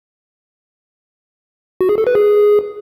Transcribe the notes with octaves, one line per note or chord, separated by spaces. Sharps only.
F#4
G#4
A4
B4
G#4